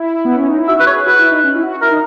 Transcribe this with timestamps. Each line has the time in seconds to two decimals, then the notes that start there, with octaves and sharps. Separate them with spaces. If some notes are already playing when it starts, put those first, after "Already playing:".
Already playing: E4
0.25 B3
0.36 C#4
0.47 D#4
0.58 E4
0.68 F#4 E5
0.80 B4
0.87 G#4 C#5
1.06 F#4 B4
1.19 E4
1.31 D#4
1.44 C#4
1.55 E4
1.63 F#4
1.82 E4 A#4
1.91 D#4